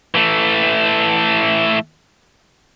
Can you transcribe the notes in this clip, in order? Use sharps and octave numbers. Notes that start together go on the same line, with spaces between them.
E3 A3